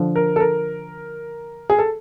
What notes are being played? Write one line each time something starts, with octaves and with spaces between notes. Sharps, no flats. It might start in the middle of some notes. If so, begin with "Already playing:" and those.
Already playing: D3 F3
A#4
A4
A#4
G#4
A4